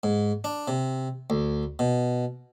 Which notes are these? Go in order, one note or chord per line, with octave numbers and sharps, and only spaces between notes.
G#2
D4
C3
D2
B2